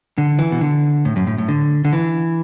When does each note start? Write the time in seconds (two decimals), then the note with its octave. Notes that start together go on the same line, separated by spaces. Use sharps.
0.18 D3
0.39 E3
0.52 B2
0.61 D3
1.05 A2
1.16 F#2
1.27 A2
1.38 A2
1.49 D3
1.85 D3
1.93 E3